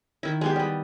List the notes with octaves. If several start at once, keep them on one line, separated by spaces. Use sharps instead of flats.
D#3 E4
G#3 B3 G4
G3 D#5